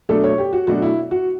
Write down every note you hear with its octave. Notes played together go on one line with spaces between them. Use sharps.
B2 F#3 A3 D4 A4
C#5
G4
F#4
B2 F#3 A3 D4 F#4
E4
F#4